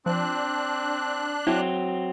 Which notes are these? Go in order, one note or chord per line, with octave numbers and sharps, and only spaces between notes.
F3 C4 D4 F#6
F#3 C4 E4